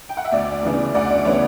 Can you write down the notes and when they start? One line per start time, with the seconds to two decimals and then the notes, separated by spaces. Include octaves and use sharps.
0.09 G5
0.17 F#5
0.25 E5
0.32 D2 D5
0.63 C#3 E3 B3 D4
0.94 D2 D5 F#5
1.10 D5
1.25 C#3 E3 B3 D4 C#5